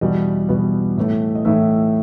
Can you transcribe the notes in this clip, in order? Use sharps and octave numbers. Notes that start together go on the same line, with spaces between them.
E2 B2 G3 B3 D#5
E2 B2 G3 B3
A2 E3 A3
D#5
A2 E3 A3 E5